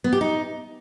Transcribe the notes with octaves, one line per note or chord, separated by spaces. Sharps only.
B3
G4
D#4